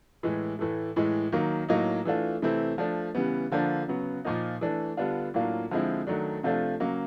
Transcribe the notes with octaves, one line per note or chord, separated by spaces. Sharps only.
A2 E3 G#3
A2 E3 A3
A2 E3 G#3
D#3 F#3 A#3
A2 F#3 A#3 D#4
E3 A3 D4 F4
C3 E3 A3 C4 E4
F3 A3 D4
C#3 E3 G3 B3
D3 F3 A#3 D4
C#3 F#3 B3
A#2 F3 A#3 D#4
E3 A3 D4
D3 G3 B3 D4 F4
A2 F#3 A#3 D4 F4
D3 F3 G#3 C4 E4
D#3 F#3 A3 D4
C3 F3 A3 D4 F4
C#3 F#3 A#3